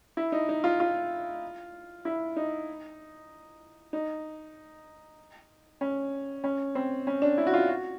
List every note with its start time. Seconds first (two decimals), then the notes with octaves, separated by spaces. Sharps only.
0.17 E4
0.32 D#4
0.49 D#4
0.64 F4
0.80 F4
2.05 E4
2.37 D#4
3.93 D#4
5.81 C#4
6.44 C#4
6.75 C4
7.07 C#4
7.22 D4
7.38 E4
7.47 F#4
7.54 F4
7.69 F#4